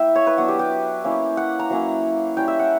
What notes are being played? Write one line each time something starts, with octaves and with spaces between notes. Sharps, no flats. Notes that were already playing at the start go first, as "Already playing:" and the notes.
Already playing: A#3 E4 E5 G5
C#5
B4
F#3 B3 D4 F#4
G4
G4
A#3 C#4 E4
F#5
A#5
F#3 A#3 C#4 E4
G3 C#4 E4 G5
E5
F#5